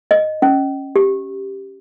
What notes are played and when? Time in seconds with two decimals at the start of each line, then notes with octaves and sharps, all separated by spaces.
0.11 D#5
0.42 C#4
0.96 G4